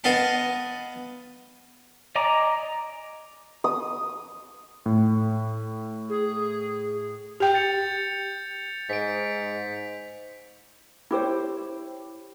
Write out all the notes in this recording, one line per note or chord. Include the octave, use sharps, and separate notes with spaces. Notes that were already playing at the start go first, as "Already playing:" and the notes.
B3 D#5 F5 A5
D5 D#5 G#5 A#5 D6
D#6
A2
G#4
G4 G5 G6 F7
A6 C#7 F7
G#2 B6 D7
E4 G4 C5 C#5